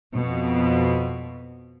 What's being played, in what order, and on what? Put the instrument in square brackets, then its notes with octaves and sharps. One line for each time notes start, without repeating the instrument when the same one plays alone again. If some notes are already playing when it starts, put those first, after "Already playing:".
[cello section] F2 B2